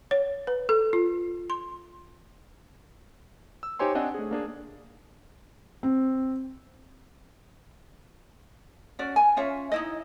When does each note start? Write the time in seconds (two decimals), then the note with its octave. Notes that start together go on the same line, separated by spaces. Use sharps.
0.11 C#5
0.47 B4
0.69 A4
0.93 F4
1.50 C6
3.63 E6
3.79 D#4 G4 C5 C#5 G#5 C6
3.95 C4 D4 D#5 F#5 G#5
4.14 A3 G#4
4.31 A#3 D4 G#4
5.83 C4
8.99 C#4 F#4 D5
9.16 G#5
9.37 C#4 F4 C#5 E5
9.72 D#4 E4 D#5